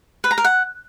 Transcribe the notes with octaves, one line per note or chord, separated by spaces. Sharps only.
B4
A#5
A#4
F#5